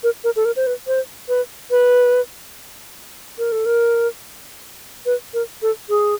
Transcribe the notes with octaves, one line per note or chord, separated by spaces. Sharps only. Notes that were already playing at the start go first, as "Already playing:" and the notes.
A#4
A#4
A4
A#4
C5
B4
C5
B4
B4
A#4
A4
A#4
B4
A#4
A4
G#4